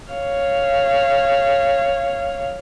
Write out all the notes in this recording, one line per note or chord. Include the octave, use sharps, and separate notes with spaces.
C#5 F5